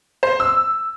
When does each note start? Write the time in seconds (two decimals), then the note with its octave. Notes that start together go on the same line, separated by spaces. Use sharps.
0.23 C5
0.40 E6